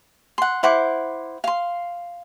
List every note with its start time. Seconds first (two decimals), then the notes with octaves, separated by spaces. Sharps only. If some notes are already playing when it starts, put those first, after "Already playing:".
0.38 F#5 C6
0.63 E4 C5 F#5 D6
1.44 F5 C6